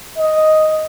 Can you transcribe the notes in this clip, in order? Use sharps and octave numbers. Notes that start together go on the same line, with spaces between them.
D#5